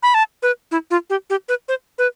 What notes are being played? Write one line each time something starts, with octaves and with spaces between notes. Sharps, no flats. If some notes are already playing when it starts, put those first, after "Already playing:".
B5
A5
B4
E4
F4
G4
G4
B4
C5
B4